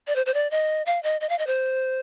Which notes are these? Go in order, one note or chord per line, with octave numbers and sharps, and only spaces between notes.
D5
C5
C5
D5
D#5
F5
D#5
D#5
F5
D#5
C5